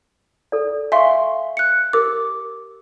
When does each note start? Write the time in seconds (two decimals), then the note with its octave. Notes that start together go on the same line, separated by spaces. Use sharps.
0.52 A4 D5
0.92 E5 F5 G#5 C6 C#6
1.57 F#6 C#7
1.93 G4 A#4 D6